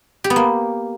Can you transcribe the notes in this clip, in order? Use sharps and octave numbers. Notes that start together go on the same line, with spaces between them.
G4
B3
A#3